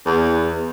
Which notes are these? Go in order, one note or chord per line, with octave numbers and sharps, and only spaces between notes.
E2